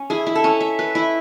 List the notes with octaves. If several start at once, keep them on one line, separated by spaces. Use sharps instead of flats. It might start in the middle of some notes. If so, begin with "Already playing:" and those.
Already playing: C#4
E4 G#4
E4
A4
C#4
E5
B4
E4